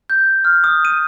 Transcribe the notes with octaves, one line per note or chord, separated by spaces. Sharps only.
G6
F6
D#6
D#7